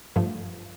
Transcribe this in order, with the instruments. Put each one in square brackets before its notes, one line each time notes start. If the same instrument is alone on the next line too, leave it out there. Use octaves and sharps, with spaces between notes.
[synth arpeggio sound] G2 F3 A3